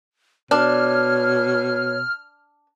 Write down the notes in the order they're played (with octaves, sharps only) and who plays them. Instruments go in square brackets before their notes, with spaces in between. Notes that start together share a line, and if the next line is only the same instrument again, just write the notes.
[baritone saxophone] B2 [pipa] D4 [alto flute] C#5 [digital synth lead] F6